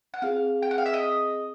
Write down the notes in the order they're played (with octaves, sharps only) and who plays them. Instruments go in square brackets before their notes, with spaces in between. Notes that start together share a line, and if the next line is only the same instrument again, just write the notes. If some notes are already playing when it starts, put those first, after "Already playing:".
[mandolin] F#5
[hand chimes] C4 F4 G#4 C5 [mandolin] F5
[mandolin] G5
F#5
F5
E5
D#5